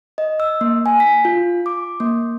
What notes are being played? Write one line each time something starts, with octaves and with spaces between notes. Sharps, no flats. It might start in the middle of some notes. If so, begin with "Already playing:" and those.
D#5
E6
A#3
G#5
B6
F4
D6
A#3